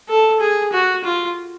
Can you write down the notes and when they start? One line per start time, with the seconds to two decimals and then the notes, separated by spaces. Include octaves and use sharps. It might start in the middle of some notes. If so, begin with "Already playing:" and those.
0.09 A4
0.40 G#4
0.73 F#4
1.04 F4